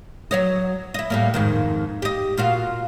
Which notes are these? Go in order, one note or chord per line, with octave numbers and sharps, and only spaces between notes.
F#3 C#5 D#5
E4 D#5
A2 G3 A#3
F2 G#2 D#3
G4 D#5
A#2 F4 F#4